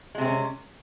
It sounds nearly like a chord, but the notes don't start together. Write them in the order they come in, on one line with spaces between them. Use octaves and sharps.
G#3 C3 C4 C#4